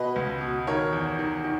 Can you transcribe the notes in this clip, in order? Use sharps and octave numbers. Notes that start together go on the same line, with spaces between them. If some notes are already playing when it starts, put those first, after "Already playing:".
Already playing: B2 B4 D#5
C#2
B2
D#3 A#4 C#5
E2
D#3
D#3